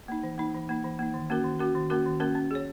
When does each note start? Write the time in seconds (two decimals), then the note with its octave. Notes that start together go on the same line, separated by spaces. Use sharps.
0.08 A#3 D#4
0.23 E3
0.38 A#3 D#4
0.54 E3
0.69 A#3 D#4
0.84 E3
0.99 A#3 D#4
1.14 D#3
1.30 A#3 C#4 F#4 A#4
1.44 D#3
1.59 A#3 C#4 F#4 A#4
1.75 D#3
1.90 A#3 C#4 F#4 A#4
2.06 D#3
2.20 A#3 C#4 F#4 A#4
2.35 C#4
2.51 G#4 C#5